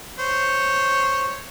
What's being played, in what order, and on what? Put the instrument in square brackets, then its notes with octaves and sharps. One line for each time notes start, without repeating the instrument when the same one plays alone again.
[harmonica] C5 C#5